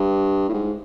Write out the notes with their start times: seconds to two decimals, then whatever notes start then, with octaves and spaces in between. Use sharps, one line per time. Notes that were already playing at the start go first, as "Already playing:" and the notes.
Already playing: G2
0.49 A2
0.54 G#2